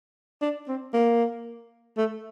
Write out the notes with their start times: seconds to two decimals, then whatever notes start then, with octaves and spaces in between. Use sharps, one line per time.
0.42 D4
0.68 C4
0.93 A#3
1.97 A3